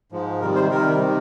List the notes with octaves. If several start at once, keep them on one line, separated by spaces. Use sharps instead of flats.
G#2 F3 G#3
C3 D#3 G3 A#4
C5
C3 D#3 G3 A#4
C3 D#3